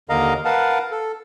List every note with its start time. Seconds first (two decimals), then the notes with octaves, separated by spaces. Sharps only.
0.09 D#2 D3 A#4 D#5 F5 A#5
0.45 A#4 B4 F5 F#5 A5
0.91 A4